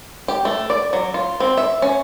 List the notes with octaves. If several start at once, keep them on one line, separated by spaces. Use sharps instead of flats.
G4
A3
D5
F#3
F4
C4
E5
C#4